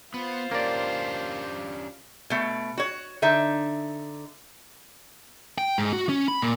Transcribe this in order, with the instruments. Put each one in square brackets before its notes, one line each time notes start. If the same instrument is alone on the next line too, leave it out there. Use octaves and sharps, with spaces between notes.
[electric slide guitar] B3 [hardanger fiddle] F4 C5
[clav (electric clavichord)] A#3 D5 [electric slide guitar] C#4 D4 G4
[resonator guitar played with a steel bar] B2 A3
F#4 C#5
D3 D#4 E5
[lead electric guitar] G5
G#2
F#4
C#4
B5
A#2